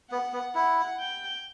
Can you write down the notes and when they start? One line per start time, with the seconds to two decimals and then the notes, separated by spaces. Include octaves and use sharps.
0.11 B3 F#5
0.33 B3
0.55 E4 F#5
1.00 G5